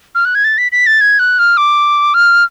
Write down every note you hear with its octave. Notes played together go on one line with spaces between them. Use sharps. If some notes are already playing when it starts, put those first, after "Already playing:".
F6
F#6
G#6
A6
B6
B6
A6
G#6
F#6
F6
D6
F6